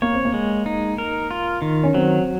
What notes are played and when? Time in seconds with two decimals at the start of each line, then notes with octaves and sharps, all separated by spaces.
0.02 A#3 C#5
0.13 C4
0.25 A#3
0.34 G#3
0.66 D#4
0.98 A#4
1.31 F4
1.62 D#3
1.83 C#4
1.94 F#3 C4